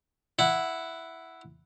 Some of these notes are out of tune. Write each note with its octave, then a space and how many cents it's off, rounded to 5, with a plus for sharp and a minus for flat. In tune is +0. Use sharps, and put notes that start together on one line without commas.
E4 +0 F#5 +0